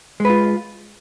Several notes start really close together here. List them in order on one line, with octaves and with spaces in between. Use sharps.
G#3 B4 F4